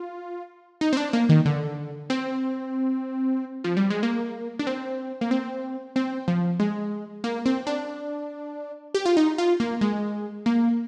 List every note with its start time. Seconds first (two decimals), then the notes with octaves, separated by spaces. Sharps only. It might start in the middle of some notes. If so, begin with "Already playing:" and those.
Already playing: F4
0.81 D#4
0.93 C4
0.97 D4
1.13 A#3
1.29 D#3
1.46 D3
2.10 C4
3.64 F3
3.77 G3
3.90 G#3
4.03 A#3
4.59 D4
4.67 C4
5.21 A#3
5.31 C4
5.96 C4
6.28 F3
6.60 G#3
7.24 A#3
7.46 C4
7.67 D4
8.94 G4
9.06 F4
9.17 D#4
9.38 F4
9.60 A#3
9.81 G#3
10.46 A#3